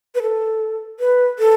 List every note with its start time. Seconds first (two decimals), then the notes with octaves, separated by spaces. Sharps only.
0.15 B4
0.22 A4
1.00 B4
1.39 A4